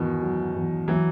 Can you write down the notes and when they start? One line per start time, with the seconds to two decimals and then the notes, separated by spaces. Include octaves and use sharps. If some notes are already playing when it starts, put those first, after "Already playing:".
Already playing: E2 B2 D#3
0.22 F#3
0.55 E2
0.88 E3 F#3